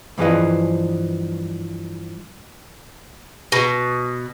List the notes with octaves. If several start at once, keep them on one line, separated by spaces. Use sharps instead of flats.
G2 E3 F3 G#4 B4 D#5
B2